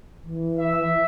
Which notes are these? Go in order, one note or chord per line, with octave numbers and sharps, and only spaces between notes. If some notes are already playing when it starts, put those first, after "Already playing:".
E3
E5